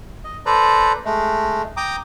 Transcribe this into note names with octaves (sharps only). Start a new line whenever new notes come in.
D#5
A4 B4 C5 D5 A#5
G#3 A3
G5 A#5 D6 D#6